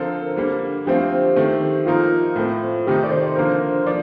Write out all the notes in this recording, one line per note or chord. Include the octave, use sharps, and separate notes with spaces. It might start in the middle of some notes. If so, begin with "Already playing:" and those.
Already playing: D3 F3 C4 F4 A4 A#4
D3 G3 A#3
D3 F3 A3 C4 F4 G4
D#3 A3 C4
F3 A#3 D#4 F4 A#4
A2 A3 C4
C3 D#3 A3 D#4 G4
D5
C5
D3 F3 A#3 F4 A#4
F3 D5